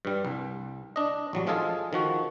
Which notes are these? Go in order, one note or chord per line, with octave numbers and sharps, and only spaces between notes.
G2 G3
C2
D4 D#5
A1 F#3 G3
F3 G#3 F4 G#4 A4 F5
D#3 F3 F#4